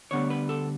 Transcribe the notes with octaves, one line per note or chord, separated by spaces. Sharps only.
D2 D3 G3 B3 C#5
B4
A4